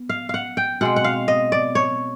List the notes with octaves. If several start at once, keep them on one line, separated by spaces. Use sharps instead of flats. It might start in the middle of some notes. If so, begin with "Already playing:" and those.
Already playing: B3
F5
F5 F#5
G5
B2 G#3 C4 F#5
F#5
F5
D#5
D5
C#5